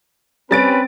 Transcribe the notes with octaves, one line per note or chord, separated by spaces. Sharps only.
G3 C4 C#4 B4 A6 D7